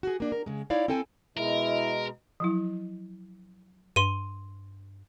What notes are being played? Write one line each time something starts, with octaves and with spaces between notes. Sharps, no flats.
F#4 G#4
A#3 D4
A#4
C#3 G#3
D#4 E4 C#5 D5 F5
C4 E4 A4 G5 G#5
B2 G#3 E4 A#4
F3 F#3 E4
G2 C6 D#7